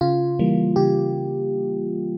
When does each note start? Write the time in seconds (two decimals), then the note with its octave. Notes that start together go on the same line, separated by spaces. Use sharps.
0.01 C#3 F4
0.39 E3 G3 A#3
0.76 C#3 G4